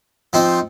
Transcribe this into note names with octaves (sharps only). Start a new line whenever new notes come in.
F3 C4 D#4